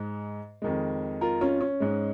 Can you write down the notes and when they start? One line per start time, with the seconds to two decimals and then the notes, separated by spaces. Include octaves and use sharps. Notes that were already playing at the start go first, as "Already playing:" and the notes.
Already playing: G#2 G#3
0.62 F2 D#3 G#3
1.21 F4 A#4
1.41 C#4 F4
1.61 C#4
1.80 G#2 G#3